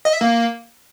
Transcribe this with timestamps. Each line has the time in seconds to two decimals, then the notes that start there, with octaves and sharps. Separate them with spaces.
0.05 D#5
0.13 E5
0.21 A#3